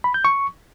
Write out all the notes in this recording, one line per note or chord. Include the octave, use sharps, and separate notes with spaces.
B5
G6
C#6